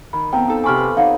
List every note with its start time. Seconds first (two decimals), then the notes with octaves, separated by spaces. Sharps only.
0.13 D#3 B5
0.33 F2 B3 G5 A#5
0.47 D#4 A4
0.64 C3 G#5 B5 C#6 D6 F6
0.78 B4
0.97 D#4 C#5 F5 F#5